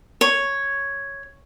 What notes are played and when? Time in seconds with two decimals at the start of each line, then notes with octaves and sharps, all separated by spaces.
0.21 C#5